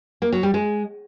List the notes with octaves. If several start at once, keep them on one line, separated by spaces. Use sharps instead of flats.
A#3
F#3
G3
G#3